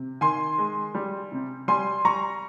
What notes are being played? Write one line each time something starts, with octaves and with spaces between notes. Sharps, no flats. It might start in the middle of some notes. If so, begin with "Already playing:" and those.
Already playing: C3
D#3 G#5 C6
G#3
G3
C3
G3 G#5 C6
G3 A#5 C#6